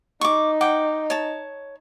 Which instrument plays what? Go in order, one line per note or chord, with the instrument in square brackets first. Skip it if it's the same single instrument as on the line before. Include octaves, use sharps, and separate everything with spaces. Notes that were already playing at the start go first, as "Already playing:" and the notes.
[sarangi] D#4 [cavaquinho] C#6 D6
[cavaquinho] F#5 G5 D6
C#5 A5